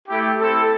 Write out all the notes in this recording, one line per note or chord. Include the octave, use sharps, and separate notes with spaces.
A3 E4 G4
C4 E4 A4